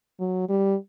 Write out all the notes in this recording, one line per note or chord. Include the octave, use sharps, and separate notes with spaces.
F#3
G3